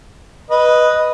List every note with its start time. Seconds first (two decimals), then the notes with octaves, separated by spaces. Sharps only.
0.50 B4 D#5